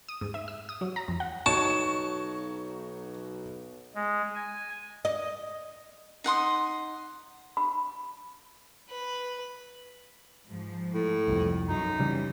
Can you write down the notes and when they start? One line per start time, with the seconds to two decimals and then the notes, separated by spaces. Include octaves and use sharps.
0.08 D#6
0.21 G#2
0.34 E5
0.48 E6
0.69 D#6
0.81 F#3
0.96 A#5
1.08 F2
1.20 F#5
1.46 B1 D#4 F#4 C#5 A5 C#6
3.95 G#3
4.35 G#5
5.05 D#5
6.24 D#4 F#5 C6 D#6
7.57 B5
8.90 B4
10.48 G#2 F3
10.92 A2
11.28 C2 F2
11.67 F#2 D#4
12.00 C#3 E3 G3